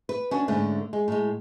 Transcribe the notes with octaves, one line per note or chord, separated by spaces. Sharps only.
B4
C#4 D4 F#4
G#2 D3 A3 C#4
G#3
A2 G#3